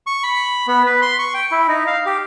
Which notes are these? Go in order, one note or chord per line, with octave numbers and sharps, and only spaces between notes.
C#6
B5
B3
B4
C6
C#6
G5
E4
D#4
F5
G4